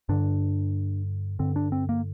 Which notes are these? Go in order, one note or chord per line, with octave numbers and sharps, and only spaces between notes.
G2 D3 D4
G2 D3 C4
D4
C4
A#3